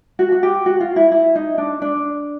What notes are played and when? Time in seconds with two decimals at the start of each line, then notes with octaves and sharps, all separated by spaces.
0.19 F#4
0.32 F#4
0.43 G4
0.66 F#4
0.80 F4
0.96 E4
1.12 E4
1.35 D#4
1.58 D4
1.82 D4